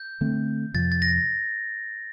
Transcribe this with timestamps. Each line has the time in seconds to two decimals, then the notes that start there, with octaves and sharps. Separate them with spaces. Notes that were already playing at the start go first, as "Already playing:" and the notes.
Already playing: G6
0.21 D3 A3 C4
0.74 F2 C3 F3 A6
0.92 A6
1.02 A#6